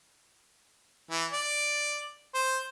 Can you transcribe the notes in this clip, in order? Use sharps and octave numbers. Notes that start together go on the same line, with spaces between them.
E3
D5
C5